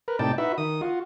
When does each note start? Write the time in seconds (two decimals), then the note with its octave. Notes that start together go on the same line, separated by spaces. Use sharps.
0.08 A#4 B4
0.19 A2 C3 D#4 D5 G5 A5
0.38 D#4 E4 F#4 B4 E5
0.58 D#3 D#6
0.81 F4 F#4